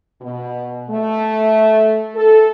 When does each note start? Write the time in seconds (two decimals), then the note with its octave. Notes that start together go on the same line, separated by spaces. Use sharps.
0.21 B2
0.90 A3
2.15 A4